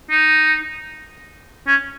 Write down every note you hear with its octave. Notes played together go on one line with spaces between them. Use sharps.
D#4
C#4